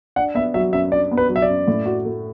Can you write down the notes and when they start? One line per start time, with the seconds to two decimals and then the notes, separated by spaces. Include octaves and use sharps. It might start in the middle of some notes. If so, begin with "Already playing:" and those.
0.16 D4 F#5
0.35 B3 E5
0.54 F#3 E5
0.73 F#2 E5
0.92 D4 D5
1.11 B3
1.17 B4
1.29 F#3
1.36 E5
1.42 D5
1.49 F#2
1.68 A2
1.86 F#4
2.05 A3